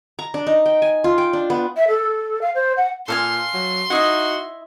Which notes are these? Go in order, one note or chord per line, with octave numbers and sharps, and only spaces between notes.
A#5
D4
D#4
G5
G#5
F4
G5
D4
B3
E5
A4
F5
C5
F#5
A#2 A4 F5 G#5 C6
F#3
D#4 E4 F#4 D#5 E5